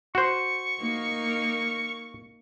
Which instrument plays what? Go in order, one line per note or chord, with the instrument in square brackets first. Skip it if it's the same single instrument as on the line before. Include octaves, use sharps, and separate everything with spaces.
[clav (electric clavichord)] F#4 C5 [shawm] C#6
[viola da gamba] A#3 D#4 A#4